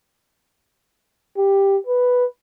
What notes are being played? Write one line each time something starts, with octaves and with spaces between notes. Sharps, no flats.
G4
B4